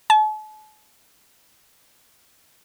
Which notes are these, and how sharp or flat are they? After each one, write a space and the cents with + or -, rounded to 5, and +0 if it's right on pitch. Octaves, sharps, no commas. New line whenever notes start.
A5 -45